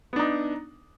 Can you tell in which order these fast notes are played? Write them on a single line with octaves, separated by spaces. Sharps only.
B3 D4 D#4